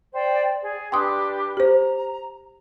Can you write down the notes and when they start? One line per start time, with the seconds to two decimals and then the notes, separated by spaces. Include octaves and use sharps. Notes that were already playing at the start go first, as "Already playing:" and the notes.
0.13 C5 D5 G5
0.63 G#4 D5
0.92 D4 G4 B4 G5 C6 D#6
1.57 G4 C5 A#5